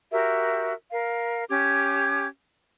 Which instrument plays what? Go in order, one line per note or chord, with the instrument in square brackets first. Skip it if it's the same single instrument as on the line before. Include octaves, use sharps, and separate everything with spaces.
[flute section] F#4 G4 A#4 E5
A#4 F5
C#4 G4 D6 G#6